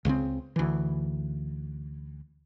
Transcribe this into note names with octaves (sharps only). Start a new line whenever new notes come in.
C#2 C#3 G#3 C4
D2 E3